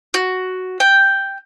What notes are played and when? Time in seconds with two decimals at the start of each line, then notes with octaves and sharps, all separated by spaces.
0.14 F#4
0.80 G5